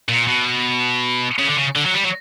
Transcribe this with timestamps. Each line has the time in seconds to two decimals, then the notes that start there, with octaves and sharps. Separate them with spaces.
0.09 A#2
0.27 B2
1.39 C#3
1.47 D3
1.57 C#3
1.76 D3
1.85 F#3
1.94 G3
2.03 F#3